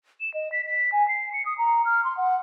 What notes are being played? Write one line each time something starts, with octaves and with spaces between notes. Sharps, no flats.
E7
D#5
B6
B6
G#5
C7
C#7
D#6
A#5
F6
C6
F#5